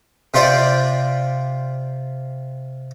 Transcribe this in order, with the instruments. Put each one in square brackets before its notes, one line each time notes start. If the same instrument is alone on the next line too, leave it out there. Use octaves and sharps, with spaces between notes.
[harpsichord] C3 F4 G4 C5 D5